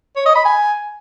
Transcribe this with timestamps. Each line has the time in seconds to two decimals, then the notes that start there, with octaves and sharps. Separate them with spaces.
0.16 C#5
0.26 D#5
0.35 B5
0.45 G#5